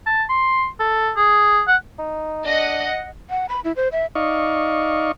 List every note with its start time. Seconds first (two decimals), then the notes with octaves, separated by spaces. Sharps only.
0.06 A5
0.29 C6
0.79 A4
1.17 G#4
1.67 F#5
1.99 D#4
2.46 D4 D#5 F#5
3.30 F#5
3.49 B5
3.64 E4
3.76 C5
3.92 E5
4.15 D#4 D5 D#5 F5 C#6